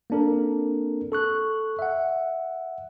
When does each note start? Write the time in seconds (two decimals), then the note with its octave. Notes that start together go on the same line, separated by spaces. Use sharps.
0.10 A#3 C4 D4 A4 A#4
1.12 A4 C#6 F#6
1.79 E5 F#5